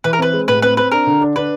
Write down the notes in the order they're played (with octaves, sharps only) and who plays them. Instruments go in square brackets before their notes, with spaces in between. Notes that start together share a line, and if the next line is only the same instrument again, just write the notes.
[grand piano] E3 [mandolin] B4
[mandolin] A#4
[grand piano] C4 [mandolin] B4
[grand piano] G#3
[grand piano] A2 [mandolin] B4
[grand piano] C4 [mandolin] B4
[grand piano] C4 [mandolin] B4
[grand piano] D4 [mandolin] A#4
[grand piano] D3
D4
[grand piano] D4 [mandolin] B4